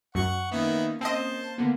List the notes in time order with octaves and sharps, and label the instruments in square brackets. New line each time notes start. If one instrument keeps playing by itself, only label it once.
[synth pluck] F#2 [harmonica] F#5 C#6
[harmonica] D#3 B3 E5 [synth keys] A#3 C#4
[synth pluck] C4 D#5 [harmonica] C5 A5
[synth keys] D3 A#3 B3